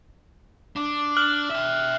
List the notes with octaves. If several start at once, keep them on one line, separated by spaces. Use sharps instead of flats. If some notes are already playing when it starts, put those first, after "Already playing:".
D4
F6 F#6 F#7
E5 G5